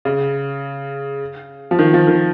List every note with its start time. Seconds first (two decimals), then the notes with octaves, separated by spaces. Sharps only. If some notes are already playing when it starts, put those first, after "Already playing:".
0.05 C#3
1.71 F3
1.79 D#3
1.94 F3
2.07 D#3